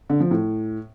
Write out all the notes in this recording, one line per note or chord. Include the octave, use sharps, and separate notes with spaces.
D3
F3
A2